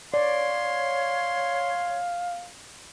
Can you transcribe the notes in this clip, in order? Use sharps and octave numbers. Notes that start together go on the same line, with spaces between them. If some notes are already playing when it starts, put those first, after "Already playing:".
C#5 D5 F5 C6